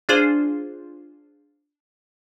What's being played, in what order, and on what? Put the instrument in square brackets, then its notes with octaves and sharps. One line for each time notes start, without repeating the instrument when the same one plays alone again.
[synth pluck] D4 F4 G#4 C5